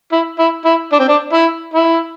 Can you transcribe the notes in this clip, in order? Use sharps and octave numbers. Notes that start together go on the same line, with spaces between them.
E4
E4
E4
D4
C4
D4
E4
E4